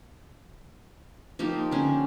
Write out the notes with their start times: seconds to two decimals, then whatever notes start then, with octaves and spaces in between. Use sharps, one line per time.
1.39 F3 A#3 D#4 G4
1.71 D3 C#4